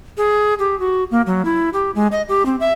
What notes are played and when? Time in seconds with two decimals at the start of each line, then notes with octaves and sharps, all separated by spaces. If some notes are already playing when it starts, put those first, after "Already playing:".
0.17 G#4
0.59 G4
0.80 F#4
1.11 A#3
1.26 F#3
1.45 E4
1.73 G4
1.95 G#3
2.12 D#5
2.29 G4
2.46 C4
2.60 E5